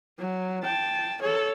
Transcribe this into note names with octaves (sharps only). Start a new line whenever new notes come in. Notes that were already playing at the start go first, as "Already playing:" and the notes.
F#3
G5 A5
A4 C#5